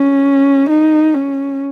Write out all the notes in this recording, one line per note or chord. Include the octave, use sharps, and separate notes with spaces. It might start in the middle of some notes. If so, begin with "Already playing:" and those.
Already playing: C#4
D#4
C#4